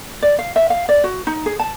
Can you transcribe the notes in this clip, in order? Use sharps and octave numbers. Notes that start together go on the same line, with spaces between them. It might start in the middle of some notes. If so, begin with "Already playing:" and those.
D5
F5
E5
F5
D5
F#4
D#4
G#4
A5